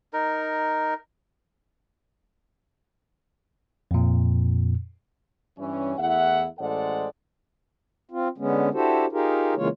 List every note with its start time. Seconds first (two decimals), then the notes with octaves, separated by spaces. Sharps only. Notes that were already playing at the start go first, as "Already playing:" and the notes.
0.13 D#4 A#4
3.91 F2 A#2
5.58 G2 E3 G3 C#4
5.98 E2 A3 E4 E5 F#5
6.59 A1 G#3 A4 C5 D5 F#5
8.11 C4 F4
8.38 D3 G#3 B3 C#4
8.73 D4 E4 F#4 G4 A4 C5
9.12 D#4 F4 G4 G#4 A#4
9.56 C#3 E3 G#3 A#3 F4 C#5